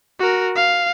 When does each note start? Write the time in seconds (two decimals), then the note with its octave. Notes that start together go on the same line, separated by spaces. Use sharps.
0.20 F#4 A#4
0.56 F5